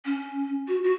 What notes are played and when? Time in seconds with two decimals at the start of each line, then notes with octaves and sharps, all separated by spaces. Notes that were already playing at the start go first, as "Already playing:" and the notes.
0.05 C#4
0.68 F#4
0.84 F#4